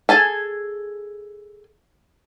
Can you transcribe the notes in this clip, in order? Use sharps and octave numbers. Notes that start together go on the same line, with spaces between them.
G#4 A4 G#5 A5